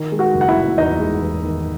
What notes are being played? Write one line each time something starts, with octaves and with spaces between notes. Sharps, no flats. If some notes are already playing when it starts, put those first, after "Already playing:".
Already playing: D#3
G#3
F#4 F#5
F#1
F#5
E4 E5
F#1
E2 D#4 D#5
G#3
E2
D#3